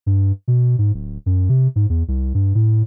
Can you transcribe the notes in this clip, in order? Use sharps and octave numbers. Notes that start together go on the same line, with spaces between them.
G2
B2
G#2
D1
F#2
C3
G#2
E2
C2
G2
A2